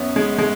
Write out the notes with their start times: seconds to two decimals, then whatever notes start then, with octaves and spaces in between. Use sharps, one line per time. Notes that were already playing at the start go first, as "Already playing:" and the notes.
Already playing: F#2 F#3 B3 C#4
0.16 G#3
0.38 G#3